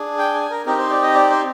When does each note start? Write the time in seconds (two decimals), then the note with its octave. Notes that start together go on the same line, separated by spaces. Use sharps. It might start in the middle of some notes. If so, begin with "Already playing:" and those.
Already playing: D4 G#4
0.19 G5
0.34 G#5
0.51 A#4
0.66 C4 D#4 G4 A#4
0.79 C5
0.90 D5
1.02 D#5
1.14 D5
1.30 C5